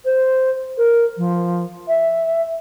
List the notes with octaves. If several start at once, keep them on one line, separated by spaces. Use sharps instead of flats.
C5
A#4
F3
E5